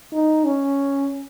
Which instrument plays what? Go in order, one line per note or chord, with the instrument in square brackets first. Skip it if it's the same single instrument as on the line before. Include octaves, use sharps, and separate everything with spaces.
[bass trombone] D#4
C#4